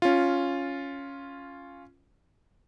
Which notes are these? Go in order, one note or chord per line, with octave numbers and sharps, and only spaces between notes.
C#4 F4